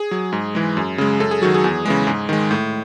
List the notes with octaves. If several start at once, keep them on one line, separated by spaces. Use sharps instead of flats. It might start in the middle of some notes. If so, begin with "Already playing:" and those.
Already playing: G#4
F#3
G#2
E3 G#3
F#2
C#3 G#3
F#2 A4
G#4
D#3 F#3 F#4
G#4
E2
C#3 E3 G#3
G#2
D#3 G#3
A2